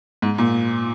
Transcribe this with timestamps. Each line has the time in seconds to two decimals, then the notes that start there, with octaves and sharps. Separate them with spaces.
0.22 G#2
0.38 A#2